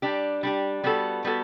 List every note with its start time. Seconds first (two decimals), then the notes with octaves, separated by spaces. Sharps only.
0.02 G3 D4 G4
0.43 G3 D4 G4
0.84 G3 B3 F#4 A4
1.24 G3 B3 F#4 A4